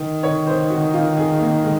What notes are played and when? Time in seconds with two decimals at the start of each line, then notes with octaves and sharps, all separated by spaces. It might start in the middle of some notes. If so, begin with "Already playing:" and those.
Already playing: D#3
0.23 C#5
0.47 C5
0.70 F#4
0.94 F4
1.17 G#4
1.40 A#3
1.64 G#3